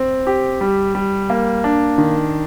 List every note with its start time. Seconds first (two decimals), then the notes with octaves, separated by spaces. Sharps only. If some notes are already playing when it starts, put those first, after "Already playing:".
Already playing: C4
0.27 G4
0.61 G3
0.95 G3
1.30 A#3
1.64 D4
1.98 D#3